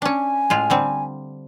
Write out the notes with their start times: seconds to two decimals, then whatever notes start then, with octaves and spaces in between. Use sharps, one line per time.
0.02 C#4 D4 G#5
0.50 A2 G#3 F4
0.70 D3 G3 C4